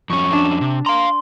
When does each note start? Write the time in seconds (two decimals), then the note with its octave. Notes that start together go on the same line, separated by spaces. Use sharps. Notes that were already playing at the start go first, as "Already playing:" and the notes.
0.10 F2 C#4 C#6
0.32 D4 E7
0.61 C3
0.86 F5 A#5 C6